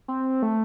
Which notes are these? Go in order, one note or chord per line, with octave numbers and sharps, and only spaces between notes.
C4
A3